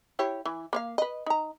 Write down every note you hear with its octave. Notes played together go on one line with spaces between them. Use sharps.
E4 G4 C#5
E3
A#3 C#5 F5
B4 D#5
D#4 A#5